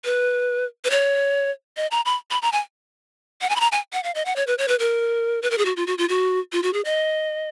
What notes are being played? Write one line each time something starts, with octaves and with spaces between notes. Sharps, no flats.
B4
B4
C#5
D#5
A#5
B5
B5
A#5
G#5
F#5
G#5
B5
A#5
G#5
F#5
F5
D#5
F#5
C#5
B4
C#5
B4
A#4
B4
A#4
G#4
F#4
F4
F#4
F4
F#4
F4
F#4
G#4
D#5